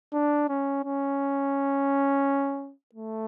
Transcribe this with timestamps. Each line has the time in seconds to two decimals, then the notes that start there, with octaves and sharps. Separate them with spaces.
0.13 D4
0.49 C#4
0.84 C#4
2.94 A3